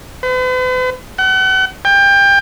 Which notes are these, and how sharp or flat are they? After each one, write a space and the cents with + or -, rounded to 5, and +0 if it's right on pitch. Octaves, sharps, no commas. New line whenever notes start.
B4 +45
F#5 +40
G5 +25